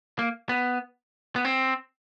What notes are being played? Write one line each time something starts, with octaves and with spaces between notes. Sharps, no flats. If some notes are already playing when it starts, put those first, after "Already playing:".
A#3
B3
B3
C4